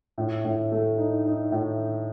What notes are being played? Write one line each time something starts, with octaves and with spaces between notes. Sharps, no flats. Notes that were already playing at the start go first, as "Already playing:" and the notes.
A2
A2
A3
D#4
D#4
A2